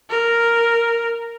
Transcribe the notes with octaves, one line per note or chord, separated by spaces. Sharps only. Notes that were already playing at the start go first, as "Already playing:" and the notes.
A#4